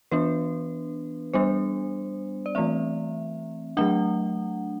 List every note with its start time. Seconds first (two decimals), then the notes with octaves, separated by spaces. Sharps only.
0.12 E3 B3 D4 B4
1.34 G3 B3 D4 C5
2.46 D5
2.55 E3 A3 C4 E5
3.77 F#3 A3 D4 F#5